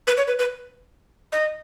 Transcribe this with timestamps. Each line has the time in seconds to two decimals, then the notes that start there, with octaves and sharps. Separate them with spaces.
0.07 B4
0.17 C#5
0.28 B4
0.39 B4
1.32 D#5